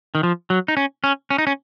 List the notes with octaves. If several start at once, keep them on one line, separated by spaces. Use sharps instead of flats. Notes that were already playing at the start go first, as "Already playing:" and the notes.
D#3
F3
F#3
D#4
C#4
C#4
C#4
D#4
C#4